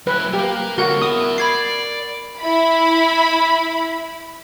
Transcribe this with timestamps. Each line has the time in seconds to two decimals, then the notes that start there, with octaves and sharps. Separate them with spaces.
0.07 F#3 E4 B4
0.33 A#3 G4 A#4
0.78 D3 G#3 F#4 A#4 F#5
1.02 B3 E4 D#6
1.38 D5 B5 G#6 C7
2.39 E4 B5